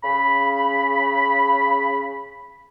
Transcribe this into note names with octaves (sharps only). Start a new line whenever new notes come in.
C#3 B5